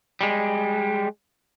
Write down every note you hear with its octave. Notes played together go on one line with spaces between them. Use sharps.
G3 G#3